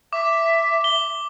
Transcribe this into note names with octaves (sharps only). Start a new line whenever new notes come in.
E5 D6
G7